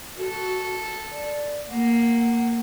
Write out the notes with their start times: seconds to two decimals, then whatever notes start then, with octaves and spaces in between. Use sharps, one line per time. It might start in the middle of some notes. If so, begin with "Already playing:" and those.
0.17 F#4 A4
1.11 D5
1.69 A#3 F#5